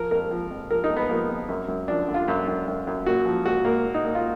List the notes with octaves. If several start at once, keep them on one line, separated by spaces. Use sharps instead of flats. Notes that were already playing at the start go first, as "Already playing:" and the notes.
Already playing: F3 A#4
F2 A#4
F3
F2
F3 A#4
D#4
F2
B3
F3 A#3
F2
F#2
F#2
F3 D4
D3
F4
F#2
F#2
F#2
F#2
A#2 F#4
F3
A#2 F#4
A#2 A#3
A#2
D#4
A#2
F4